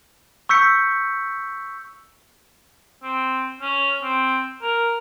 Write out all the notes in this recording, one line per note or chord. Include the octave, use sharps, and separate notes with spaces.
C#6 E6 G6 B6 C#7
C4
C#4
C4
A#4